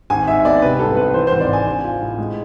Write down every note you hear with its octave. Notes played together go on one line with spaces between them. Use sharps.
G#1 G#5
G#2 E5
B3 D5
C3 B4
C2 A4
C4 B4
E3 C5
C5
G#1
D5
G#1 G#5
D4
F4
A2
G#3